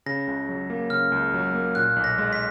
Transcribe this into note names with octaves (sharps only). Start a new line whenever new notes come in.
C#3 A#6
C#2
F#3
A#3
C#3 F6
C#2
F#3
A#3
A#2 F#6
B1
A#6
G#3
B6